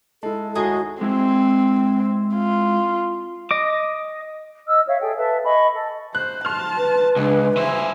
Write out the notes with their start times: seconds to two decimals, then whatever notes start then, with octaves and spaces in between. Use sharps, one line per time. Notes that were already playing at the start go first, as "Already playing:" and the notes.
0.23 G#3 E4 A4 A5
0.55 D#2 G#3 A3 F#4 G#4 D#5 A#5
1.01 G#3 C4 E4 G#4
2.35 F4
3.51 D#5 D6
4.67 D#5 E6 F6
4.87 C#5 E5 F5
5.01 G#4 A4 G5
5.17 A4 B4 E5 A5
5.44 D#5 G#5 B5 C#6
5.73 A4
6.15 C5 F#6
6.45 A5 C6 F6
6.78 B4
7.16 C#2 D4 G#4
7.57 E3 C5 E5 G#5